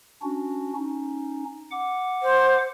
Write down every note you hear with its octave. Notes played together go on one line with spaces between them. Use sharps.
C#4 D4 F#4
C#4 D#4
F#5 D6
C5